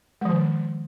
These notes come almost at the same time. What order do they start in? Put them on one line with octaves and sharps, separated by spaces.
G#3 F3 D#3